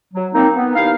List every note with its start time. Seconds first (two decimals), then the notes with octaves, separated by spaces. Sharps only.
0.13 F#3
0.34 A#3 C4 D#4
0.55 B3
0.75 D#2 D#4 E4 F5